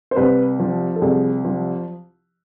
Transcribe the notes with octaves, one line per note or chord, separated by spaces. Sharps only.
C5
C2 B4
F3
A4
C2 G#4
F3